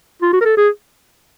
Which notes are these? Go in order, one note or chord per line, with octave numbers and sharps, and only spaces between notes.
F4
F#4
A#4
A4
G#4